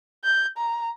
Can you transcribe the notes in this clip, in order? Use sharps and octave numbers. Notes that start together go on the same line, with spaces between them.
G6
A#5